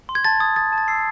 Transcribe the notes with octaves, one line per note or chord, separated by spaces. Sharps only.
C6
G#6
A5 A6
D#6 G#6
D#6 A6
A5
A6
E6 C7